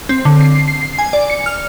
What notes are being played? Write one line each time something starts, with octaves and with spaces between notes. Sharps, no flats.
C4
D3
C7
C7
C7
G#5
D5
C#7
F6